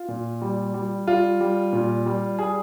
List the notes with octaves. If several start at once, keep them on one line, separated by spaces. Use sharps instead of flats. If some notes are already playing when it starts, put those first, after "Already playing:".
Already playing: F4
A#2
G3
G3
G3 F4
G3
A#2
G3
G3 G#4